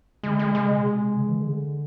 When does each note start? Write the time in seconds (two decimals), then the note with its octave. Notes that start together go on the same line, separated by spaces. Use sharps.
0.23 D3 G#3
0.39 G#3
0.55 C#3 G#3
0.70 B2
0.85 C3
1.17 C#3
1.27 E3
1.38 D3